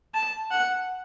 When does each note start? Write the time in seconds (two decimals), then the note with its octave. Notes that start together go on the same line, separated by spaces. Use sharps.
0.14 A5
0.51 F#5